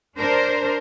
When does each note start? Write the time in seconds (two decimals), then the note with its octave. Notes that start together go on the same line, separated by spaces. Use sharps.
0.17 D4 A#4 C5